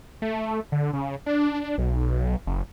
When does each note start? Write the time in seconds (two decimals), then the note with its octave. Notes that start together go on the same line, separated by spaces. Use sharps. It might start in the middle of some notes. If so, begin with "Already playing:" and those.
0.22 A3
0.72 D3
0.93 C#3
1.26 D4
1.78 B1
2.47 F#1